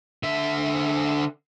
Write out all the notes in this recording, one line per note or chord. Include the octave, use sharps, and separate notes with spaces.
D3 E5